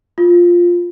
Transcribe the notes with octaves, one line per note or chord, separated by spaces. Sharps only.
F4